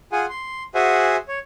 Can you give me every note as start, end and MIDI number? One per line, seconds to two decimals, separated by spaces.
0.12 0.26 65
0.12 0.26 68
0.12 0.26 78
0.12 0.26 80
0.30 0.63 84
0.75 1.16 66
0.75 1.16 68
0.75 1.16 72
0.75 1.16 76
0.75 1.16 78
0.75 1.16 80
1.28 1.39 73